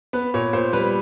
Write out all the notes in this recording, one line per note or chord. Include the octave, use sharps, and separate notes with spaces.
B3 B4
A#2 C#5
A#2 C5
G3 B4